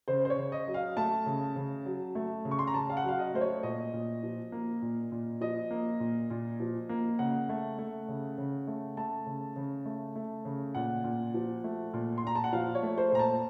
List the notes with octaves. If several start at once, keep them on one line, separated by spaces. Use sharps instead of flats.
C#3 C5
C5
C#5
C#3
D#5
F#3
F5
A3 A5
C#3
C#3
F#3
A3
C#3
C#6
C6
A#5
C#3 A5
F5
F#5
F#3 F5
D#5
A3 C5
C#5
A#2 D#5
A#2
F3
A#3
A#2
A#2
F3 D#5
A#3
A#2
A#2
F3
A#3
C#3 F#5
A3
A3
C#3
C#3
A3
A3 A5
C#3
C#3
A3
A3
C#3
A#2 F#5
A#2
F3
A3
A#2
C6
A#2 A#5
A5
F#5
F3 F5
C#5
A3
C5
A#2 A#5
A5